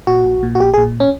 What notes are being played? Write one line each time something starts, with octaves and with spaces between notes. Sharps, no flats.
A#2 F#4
A#1
A#2
F#4
A#1 G4
A#2 G#4
C#4